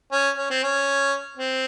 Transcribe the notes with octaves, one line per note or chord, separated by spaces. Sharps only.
C#4
C#4
C4
C#4
C4